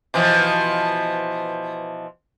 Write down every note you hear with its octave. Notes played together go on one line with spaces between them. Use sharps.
B2 E3 F3